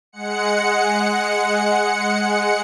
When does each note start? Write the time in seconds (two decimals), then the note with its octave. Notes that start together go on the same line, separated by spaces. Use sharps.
0.12 G#3 F#5 C#7